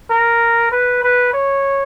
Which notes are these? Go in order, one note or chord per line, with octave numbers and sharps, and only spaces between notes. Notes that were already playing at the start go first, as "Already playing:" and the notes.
A#4
B4
B4
C#5